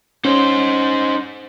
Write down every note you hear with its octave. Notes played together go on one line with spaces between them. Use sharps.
C#4 D#4 C5